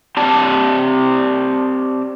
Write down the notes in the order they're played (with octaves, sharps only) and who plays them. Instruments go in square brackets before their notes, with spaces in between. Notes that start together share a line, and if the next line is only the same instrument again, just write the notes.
[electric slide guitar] C4 G4 D5 A5